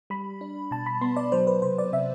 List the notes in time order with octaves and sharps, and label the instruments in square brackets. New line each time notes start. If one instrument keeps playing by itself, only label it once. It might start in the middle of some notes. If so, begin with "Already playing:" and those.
[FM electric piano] G3 B5
D4
B2 A5
B5
B3 C6
D5
F#3 C5
B4
C3 C5
D5
C3 E5